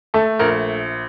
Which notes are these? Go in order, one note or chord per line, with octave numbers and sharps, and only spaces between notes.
A3 A4
A#1 A#4